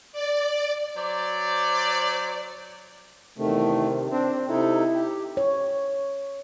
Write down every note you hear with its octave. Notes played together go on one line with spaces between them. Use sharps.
D5
F#3 C5 D5
E2 C3 D#3 A3
C4 D4
C3 D#4 E4 A4
G4
C#5